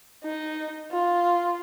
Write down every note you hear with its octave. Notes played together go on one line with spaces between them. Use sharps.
D#4
F4